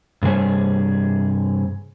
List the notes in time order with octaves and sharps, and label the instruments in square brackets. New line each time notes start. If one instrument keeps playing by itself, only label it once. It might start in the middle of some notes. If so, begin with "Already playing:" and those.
[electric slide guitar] G2 C3 G3 G#4 C#5